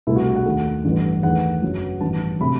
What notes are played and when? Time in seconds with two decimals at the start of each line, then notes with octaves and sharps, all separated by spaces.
0.07 C2 B2 A3 E4
0.16 F#4
0.36 F#5
0.45 D#2 D#3 A3
0.85 A1 G2 E3 A3
1.23 E2 D#3 A3 F#5
1.62 F#1 F#2 F#3
2.01 A1 G2 D#3 A5
2.40 C3 F#3 A3 B5